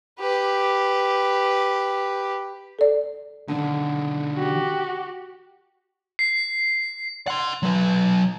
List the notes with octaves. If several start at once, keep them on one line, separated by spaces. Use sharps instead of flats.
G4 B4
A4 D5
B2 D3 D#3
F#4 G4
C7
F#5 C6
F#3 B4